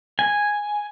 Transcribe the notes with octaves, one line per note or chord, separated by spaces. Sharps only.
G#5